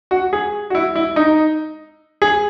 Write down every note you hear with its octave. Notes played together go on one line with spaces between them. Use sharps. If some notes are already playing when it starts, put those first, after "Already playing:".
F#4
G#4
F#4
E4
E4
D#4
G#4